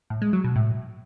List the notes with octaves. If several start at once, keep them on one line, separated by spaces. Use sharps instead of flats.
A2
G#3
F#3
B2
A2